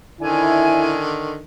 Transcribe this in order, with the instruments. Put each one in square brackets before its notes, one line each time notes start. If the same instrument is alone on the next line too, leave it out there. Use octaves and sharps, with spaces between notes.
[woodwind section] F2 D5 G#5 [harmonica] D3 D#3 [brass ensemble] E4